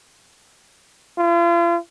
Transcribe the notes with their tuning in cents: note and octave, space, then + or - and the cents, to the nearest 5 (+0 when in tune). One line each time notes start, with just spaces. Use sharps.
F4 -40